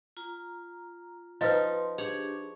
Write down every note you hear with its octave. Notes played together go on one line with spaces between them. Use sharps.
F4 A#5
F3 D#4 B4 D#5 C6
D4 G4 G#4 C#5